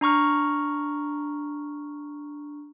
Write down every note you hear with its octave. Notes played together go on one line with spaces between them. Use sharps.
D4 A#5 C#6 F6